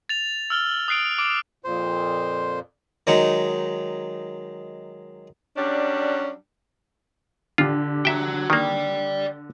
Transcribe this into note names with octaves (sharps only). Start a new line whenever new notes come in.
A6 F7
E6 F6 G7
D#6 F#6 C7 D7
D6 D7
F2 A#2 C5
D#3 F#3 G#3 D#4
F#3 G3 C#4 D4
D3 F4 G4
F#4 E5 G5 A#5
D#3 A#3 D5 G5